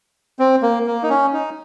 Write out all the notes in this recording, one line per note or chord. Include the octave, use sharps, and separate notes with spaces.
C4
A#3
A#3
D#4
C#4
D#4